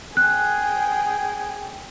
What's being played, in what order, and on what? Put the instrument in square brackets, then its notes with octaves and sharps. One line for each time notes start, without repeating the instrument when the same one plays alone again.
[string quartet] G#4 G5 [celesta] F#6